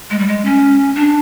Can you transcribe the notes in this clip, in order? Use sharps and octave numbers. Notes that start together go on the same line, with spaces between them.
G#3
G3
G#3
C#4
D4